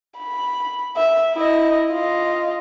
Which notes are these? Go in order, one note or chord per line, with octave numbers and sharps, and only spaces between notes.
B5
E5
E4 D#5
F4 D#5